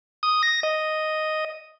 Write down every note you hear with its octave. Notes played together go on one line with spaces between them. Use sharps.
D#6
A#6
D#5